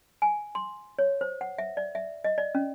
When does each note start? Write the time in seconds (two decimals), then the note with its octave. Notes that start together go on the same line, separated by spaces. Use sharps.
0.22 G#5
0.55 C6
0.99 C#5
1.21 C5
1.41 F#5
1.58 E5
1.77 D5
1.95 E5
2.24 D#5
2.38 D5
2.55 C#4